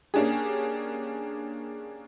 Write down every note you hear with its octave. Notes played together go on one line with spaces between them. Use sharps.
A#3 C#4 D4 G4 G#4